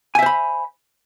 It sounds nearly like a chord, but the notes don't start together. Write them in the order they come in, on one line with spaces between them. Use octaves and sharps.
G#5 E5 C5 B5